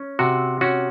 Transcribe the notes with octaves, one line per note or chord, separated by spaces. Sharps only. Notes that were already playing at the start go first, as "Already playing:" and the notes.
Already playing: C#4
C3 F#4
C#4 F#4